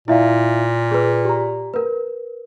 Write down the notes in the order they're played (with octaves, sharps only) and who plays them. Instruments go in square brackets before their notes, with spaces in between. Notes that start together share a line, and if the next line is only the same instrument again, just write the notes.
[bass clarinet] A#2 [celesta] E4 E5 F5
[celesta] G#4 B4
G4 A#5
A#4 B4